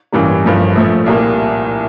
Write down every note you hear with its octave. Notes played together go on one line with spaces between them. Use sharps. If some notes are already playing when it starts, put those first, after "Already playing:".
A1 G2 E3 G3 A#3
G1 G2 F3 A#3
A#1 A2 F3 A3
C2 A#2 G3 A#3